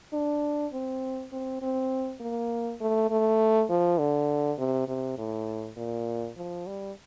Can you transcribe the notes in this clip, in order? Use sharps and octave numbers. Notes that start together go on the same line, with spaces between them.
D4
C4
C4
C4
A#3
A3
A3
F3
D3
C3
C3
A2
A#2
F3
G3